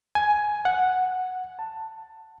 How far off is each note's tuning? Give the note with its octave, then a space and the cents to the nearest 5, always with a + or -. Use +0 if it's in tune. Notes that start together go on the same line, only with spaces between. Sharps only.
G#5 +10
F#5 -5
A5 +10